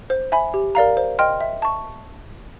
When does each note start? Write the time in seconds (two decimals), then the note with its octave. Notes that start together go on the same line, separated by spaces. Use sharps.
0.10 C5
0.32 E5 G#5 B5
0.54 G4
0.75 A#4 D5 F5 A#5
0.97 C5
1.19 D#5 G5 C6 F6
1.41 E5
1.62 A5 C#6